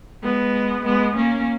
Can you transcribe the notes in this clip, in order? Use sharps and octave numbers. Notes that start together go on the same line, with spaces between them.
G#3 B3
G#3 B3
A#3 C#4